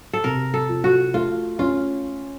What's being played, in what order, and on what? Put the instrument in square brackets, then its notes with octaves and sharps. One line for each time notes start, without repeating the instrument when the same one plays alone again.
[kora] A4
[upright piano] C3 [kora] A#4
[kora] A4
[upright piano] F3
[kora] F#4
[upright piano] A3 [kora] F4
[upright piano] C#4 [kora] F4